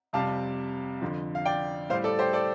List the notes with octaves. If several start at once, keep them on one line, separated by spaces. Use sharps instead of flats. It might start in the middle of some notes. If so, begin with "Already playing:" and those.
F2 C3 G3 F5 A5
F2 D3 F3
F5
D5 G5
A2 G3 C5 F5
A4 D5
G4 C5
A4 D5